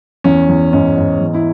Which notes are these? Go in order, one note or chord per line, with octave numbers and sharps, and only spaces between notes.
E2 C#4
E2
G#2 C#4
G#2
E2
E4